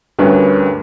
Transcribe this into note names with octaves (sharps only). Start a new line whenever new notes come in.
D2 G2 D3 C#4 A#4 B4